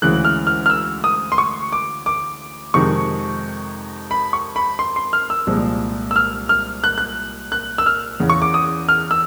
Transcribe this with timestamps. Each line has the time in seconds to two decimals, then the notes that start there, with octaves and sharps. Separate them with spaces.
0.02 D2 C#3 E3 G#3 F#6
0.25 F6
0.47 F6
0.66 F6
0.70 E6
1.04 D#6
1.32 C6
1.38 C#6
1.72 D6
2.06 D6
2.74 F2 C3 D#3 G#3 C#6
4.11 B5
4.33 C#6
4.56 B5
4.79 C6
4.96 C6
5.13 F6
5.30 E6
5.47 C2 A#2 F3 G#3
6.11 E6
6.16 F6
6.49 F6
6.84 F#6
6.98 F#6
7.52 F#6
7.78 E6
7.86 F6
8.20 E2 C#3 E3
8.30 C#6
8.42 D6
8.54 D#6
8.89 F6
9.11 E6